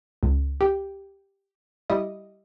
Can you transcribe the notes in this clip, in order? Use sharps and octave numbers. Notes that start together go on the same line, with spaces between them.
C#2
G4
G3 E4 D#5